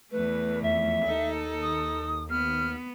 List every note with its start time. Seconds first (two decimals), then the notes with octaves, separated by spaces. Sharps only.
0.11 E2 A3 B4
0.62 F2 E5
1.05 D#2 D#4 A4
1.62 D#6
2.30 B3 F6